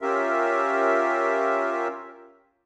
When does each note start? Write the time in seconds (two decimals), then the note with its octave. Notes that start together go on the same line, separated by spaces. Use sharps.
0.01 C#4 F4 G4 A#4 E5